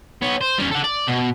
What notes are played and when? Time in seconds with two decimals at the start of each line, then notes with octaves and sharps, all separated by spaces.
0.22 B3 C#5
0.41 C5
0.58 G3 C#4
0.71 A4 F#5
0.84 D5
1.08 B2